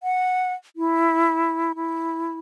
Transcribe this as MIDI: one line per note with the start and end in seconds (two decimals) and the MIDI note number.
0.03 0.53 78
0.76 1.73 64
1.75 2.39 64